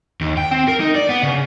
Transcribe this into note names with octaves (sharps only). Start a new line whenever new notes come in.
D#2
G5
C4
A#4
D#4
D5
B3
C#3